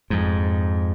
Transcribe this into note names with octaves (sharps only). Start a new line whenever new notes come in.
F2 G#2